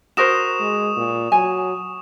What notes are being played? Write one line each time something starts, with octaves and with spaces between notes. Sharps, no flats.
F#4 A#4 C5 C#6 D#6 E7
G#3
A#2
F#3 G#5